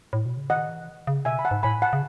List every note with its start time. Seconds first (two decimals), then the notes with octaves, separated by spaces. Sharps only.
0.13 A2
0.25 B2
0.37 C#3
0.50 D#3 D#5 F#5
0.69 E3
1.07 C#3
1.25 B2 E5 G#5
1.39 B5
1.45 F#5 A5
1.51 G#2
1.63 A2 G#5 B5
1.82 F#5 A5
1.93 C#3